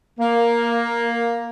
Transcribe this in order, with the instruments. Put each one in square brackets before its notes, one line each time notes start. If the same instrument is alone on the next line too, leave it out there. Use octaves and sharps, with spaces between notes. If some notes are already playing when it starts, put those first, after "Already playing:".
[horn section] A#3